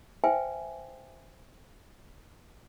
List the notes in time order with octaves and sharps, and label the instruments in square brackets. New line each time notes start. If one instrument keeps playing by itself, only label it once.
[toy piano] B4 C5 E5 G5 G#5